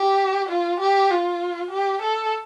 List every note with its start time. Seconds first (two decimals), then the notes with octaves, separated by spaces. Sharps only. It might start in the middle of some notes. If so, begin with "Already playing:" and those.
Already playing: G4
0.49 F4
0.80 G4
1.10 F4
1.71 G4
2.01 A4